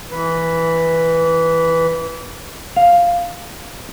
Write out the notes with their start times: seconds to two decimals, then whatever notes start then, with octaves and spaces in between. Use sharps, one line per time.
0.11 E3 B4
2.76 F5